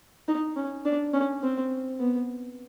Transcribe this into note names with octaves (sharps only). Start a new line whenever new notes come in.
D#4
C#4
D4
C#4
C4
B3